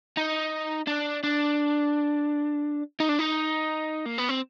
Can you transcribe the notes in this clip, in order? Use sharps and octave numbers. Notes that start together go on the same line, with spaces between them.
D#4
D4
D4
D#4
D4
D#4
A#3
B3
C4